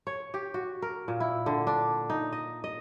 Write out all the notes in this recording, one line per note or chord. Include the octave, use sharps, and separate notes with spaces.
C#5
G4
F#4
A#4
A#2
E4
D3
D4
D#4
D#5
D#5